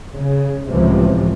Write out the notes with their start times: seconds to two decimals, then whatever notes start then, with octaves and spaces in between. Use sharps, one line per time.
0.14 C#3
0.70 C#2 A2 C3 E3 F3